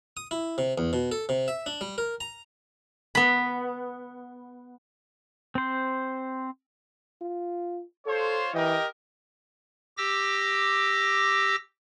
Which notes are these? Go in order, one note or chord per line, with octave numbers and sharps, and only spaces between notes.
D#6
E4
C3
E2
B2
A4
C3
E5
D4
G3
A#4
A#5
B3 B5
C4 C5
F4
F4 A4 C5 C#5
E3 G4 A#4 D#5
G4 D6 E6 A#6